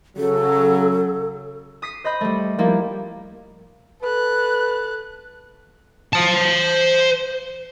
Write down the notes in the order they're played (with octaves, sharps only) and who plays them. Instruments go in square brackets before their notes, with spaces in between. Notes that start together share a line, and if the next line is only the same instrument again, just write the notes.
[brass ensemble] C#3 F#3 [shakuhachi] A4
[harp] D#6 B6 C7
C5 D#5 B5 G6
G3 A3
F3 G3 A#3 E4
[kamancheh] A4 F#6 [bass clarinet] B4
[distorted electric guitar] C5 A5